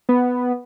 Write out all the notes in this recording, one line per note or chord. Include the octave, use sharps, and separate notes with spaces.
B3